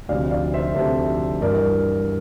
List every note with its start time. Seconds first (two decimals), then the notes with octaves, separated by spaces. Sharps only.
0.08 D2 C3 F3 D5 F5
0.31 D5 F5
0.54 C5 E5
0.75 D2 C3 F3 A4 C5
1.41 G2 E3 A#4 D5